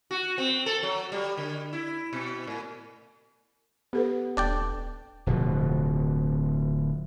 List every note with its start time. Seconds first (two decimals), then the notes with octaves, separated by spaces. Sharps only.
0.11 F#4
0.38 C4
0.66 A4
0.83 F#3
1.12 G3
1.37 D3
1.73 E4
2.13 B2
2.47 A2
3.93 B3 G4 A4 B4
4.37 D#1 D4 D5 G5
5.26 D1 B2 F3